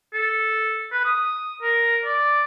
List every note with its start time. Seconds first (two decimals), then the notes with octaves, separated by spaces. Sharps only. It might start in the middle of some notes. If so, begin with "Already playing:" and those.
0.13 A4
0.92 B4
1.05 D#6
1.62 A#4
2.05 D5